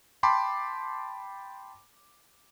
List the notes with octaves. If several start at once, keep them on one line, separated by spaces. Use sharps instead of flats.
G5 A5 B5 C6 D6